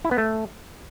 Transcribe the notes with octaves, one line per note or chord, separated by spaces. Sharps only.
E4
B3
A3